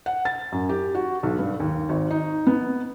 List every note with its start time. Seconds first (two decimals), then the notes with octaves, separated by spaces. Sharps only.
0.06 F#5
0.25 A6
0.52 F#2
0.69 G4
0.95 F#4
1.23 B1
1.39 G2
1.60 D#2
1.89 G#1
2.11 D#4
2.47 B3